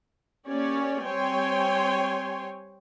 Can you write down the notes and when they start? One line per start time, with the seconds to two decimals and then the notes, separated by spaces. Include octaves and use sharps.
0.47 A#3 C#4 G4 C#5 D5
1.07 G3 C4 C#5 G5 G#5 C6